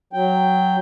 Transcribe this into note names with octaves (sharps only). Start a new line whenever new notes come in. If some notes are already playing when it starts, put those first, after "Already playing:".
F#3 G5